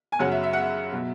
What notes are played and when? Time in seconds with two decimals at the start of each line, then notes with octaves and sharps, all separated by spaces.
0.12 G#5
0.19 F#2 C#3 F#3 C#4 F#5
0.32 E5
0.43 E5
0.53 F#5
0.61 E5
0.92 B2 F#3